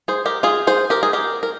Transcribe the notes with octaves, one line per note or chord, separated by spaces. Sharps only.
G#4 C5
G4 A#4
F4 G#4
G#4 C5
G4 A#4
G#4
G4 A#4
A#4